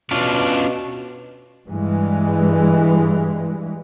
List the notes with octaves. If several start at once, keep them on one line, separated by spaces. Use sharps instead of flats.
B2 C#4 D4 F4
G2 E3 G#3